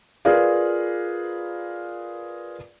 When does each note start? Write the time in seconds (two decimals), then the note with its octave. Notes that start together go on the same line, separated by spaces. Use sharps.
0.25 F4 G#4 A#4 B4 D5 F5